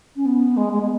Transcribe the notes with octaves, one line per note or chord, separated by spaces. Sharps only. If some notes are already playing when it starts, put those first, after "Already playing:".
C#4
B3
G#3
G#3
B3